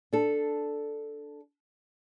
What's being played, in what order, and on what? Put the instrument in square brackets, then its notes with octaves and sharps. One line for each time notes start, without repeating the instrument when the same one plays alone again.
[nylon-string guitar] D4 A4